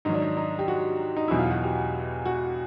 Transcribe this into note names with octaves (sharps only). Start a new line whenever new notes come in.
G#2 D#3 F#3 D#4
D4
D#4
D#4
G4
F#4
D#4
E2 B2 F#3 E4
F4
F#4
G4
F#4